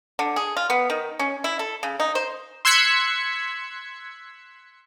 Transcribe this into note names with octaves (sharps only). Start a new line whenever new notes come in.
D3
G#4
F4
B3
D#3
C#4
E4
A4
C#3
D#4
C5
C6 E6 F#6 G#6 B6 C#7